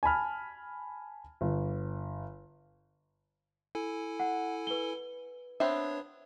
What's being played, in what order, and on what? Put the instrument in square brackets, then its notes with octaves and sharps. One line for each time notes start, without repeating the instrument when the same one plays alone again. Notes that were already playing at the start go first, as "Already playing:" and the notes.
[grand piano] G#5 A5 B5 F6
G1
[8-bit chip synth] E4 A4 G#5
[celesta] F#5
B4 G7
[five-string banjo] B3 C4 E5 [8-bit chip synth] D4 C#5